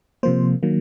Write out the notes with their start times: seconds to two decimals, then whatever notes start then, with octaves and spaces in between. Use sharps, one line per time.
0.23 C3 F3 A#3 C5
0.63 D#3 F#3 A#3